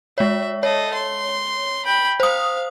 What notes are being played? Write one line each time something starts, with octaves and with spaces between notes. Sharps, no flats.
G#3 C#5 E5
A4 C#5 D#5
C6
G5 B5
C5 F5 D#6